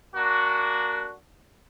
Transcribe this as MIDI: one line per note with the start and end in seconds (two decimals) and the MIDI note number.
0.15 1.14 58
0.15 1.14 62
0.15 1.14 66